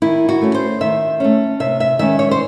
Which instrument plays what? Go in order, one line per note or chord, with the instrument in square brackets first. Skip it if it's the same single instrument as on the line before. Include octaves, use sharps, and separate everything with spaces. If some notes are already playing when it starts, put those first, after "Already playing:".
[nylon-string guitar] D#3 E4
F#4
A3 C#4
C5
D#3 E5
A3 C#4
C3 E5
E5
D#3 G#3 C#4 E5
C#5
C5